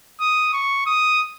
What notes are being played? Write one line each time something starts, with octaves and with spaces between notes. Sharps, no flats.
D#6
C#6
D#6